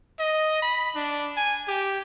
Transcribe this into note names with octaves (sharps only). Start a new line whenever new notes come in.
D#5
B5
D4
G#5
G4